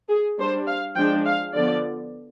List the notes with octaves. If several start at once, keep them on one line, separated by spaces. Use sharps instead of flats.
G#4
G3 D4 C5
F5
F3 G#3 D4 G5
F5
D3 F3 B3 D5